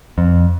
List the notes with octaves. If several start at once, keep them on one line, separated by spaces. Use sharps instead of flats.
F2